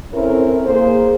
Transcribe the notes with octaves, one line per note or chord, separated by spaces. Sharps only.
C4 C#4 E4 A4 A#4
A#3 G#4 C5